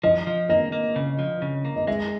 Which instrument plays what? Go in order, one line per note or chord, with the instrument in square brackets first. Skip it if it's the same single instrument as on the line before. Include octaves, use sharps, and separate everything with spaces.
[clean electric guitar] F3 [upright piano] D#5
[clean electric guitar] F3
[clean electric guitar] A#3 [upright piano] D#5
[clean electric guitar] A#3
C#3
F3
C#3
A#3
[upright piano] D#5
[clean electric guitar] G#3 [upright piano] E5